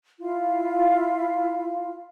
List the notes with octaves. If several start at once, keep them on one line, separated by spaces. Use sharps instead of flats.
E4 F4 F5